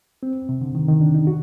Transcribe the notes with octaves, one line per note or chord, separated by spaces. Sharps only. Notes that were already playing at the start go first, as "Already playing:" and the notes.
C4
C3
D3
D#3
D#3
D4
D#4
F#4